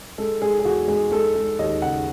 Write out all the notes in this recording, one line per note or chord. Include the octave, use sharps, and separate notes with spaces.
G#3 A4
G#3 G#4
G#4
E2 F#4
G#3 G#4
G#3 A4
G#3
D#2 D#5
C#3 F#5